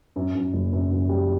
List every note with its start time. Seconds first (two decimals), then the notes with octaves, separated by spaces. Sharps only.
0.16 F#2
0.35 F#2
0.53 F#1
0.72 F#2
0.91 F#2
1.09 G3